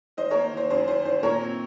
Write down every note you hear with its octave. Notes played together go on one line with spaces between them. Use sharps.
D#3 C5 D#5
A#3 A#4 C#5
D#3 C5
F#2 C5
D#3 C5
D#3 C5
A#2 A#4 C#5
C4